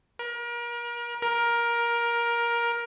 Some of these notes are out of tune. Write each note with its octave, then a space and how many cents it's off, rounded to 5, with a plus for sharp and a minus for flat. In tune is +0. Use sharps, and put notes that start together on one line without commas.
A#4 +35
A#4 +15